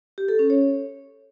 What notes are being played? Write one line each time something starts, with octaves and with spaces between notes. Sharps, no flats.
G4
A4
C#4
C#5